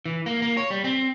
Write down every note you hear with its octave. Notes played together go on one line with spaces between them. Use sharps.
E3
A#3
A#3
C#5
G3
C4